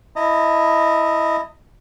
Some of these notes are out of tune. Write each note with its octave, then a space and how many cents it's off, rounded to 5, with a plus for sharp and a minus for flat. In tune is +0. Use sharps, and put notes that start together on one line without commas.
E4 +0 D#5 +0 A#5 -45